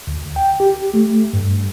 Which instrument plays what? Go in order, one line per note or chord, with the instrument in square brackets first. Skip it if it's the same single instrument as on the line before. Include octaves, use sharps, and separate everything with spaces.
[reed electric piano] D2
G5
G4
A3
G2